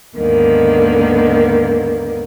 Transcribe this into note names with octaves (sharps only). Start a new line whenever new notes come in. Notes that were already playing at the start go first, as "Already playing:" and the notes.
D#2 G#2 D3 D#3 A#3 B3